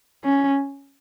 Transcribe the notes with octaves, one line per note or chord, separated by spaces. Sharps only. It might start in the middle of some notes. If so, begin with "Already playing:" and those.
C#4